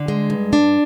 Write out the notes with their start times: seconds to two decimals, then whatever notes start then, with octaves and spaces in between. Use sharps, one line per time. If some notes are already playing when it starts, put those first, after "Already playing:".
Already playing: D3
0.08 G#3
0.30 G2
0.53 D4